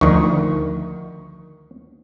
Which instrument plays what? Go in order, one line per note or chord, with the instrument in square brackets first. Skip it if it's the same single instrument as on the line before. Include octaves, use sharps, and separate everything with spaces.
[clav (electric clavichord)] D2 D#3 [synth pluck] F3 C#6